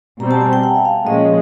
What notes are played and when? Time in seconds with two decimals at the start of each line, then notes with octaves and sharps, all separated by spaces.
0.20 B2 G3 C4 A#5
0.31 A5
0.41 G#5
0.53 G5
0.63 F#5
0.75 E5
0.85 F5
1.06 A#2 F3 G#3 C#4 D#5